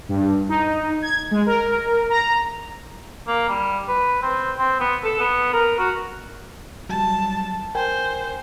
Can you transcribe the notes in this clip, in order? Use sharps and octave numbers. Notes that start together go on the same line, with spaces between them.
G2
D#4
G#6
G#3
A#4
A#5
A#3
G3
B4
C4
C4
B3
A4
B3
A#4
F#4
F#3 G3 A5
A#4 C5 G5 G#5